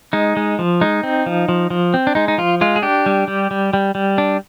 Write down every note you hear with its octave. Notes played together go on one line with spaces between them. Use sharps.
G#3 D#4
G#3
F3
G#3 D#4
C4
F3
F3
F3
C4
D4
G#3 D#4
D#4
F3 F4
G#3 F4
G#4
D4 G4
G3
G3
G3
G3
G3
D4